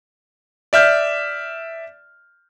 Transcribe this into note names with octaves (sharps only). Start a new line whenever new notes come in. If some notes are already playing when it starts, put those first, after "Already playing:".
D5 E5 F6 G6